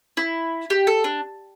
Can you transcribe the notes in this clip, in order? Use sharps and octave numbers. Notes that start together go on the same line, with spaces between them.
E4
G4
A4
D4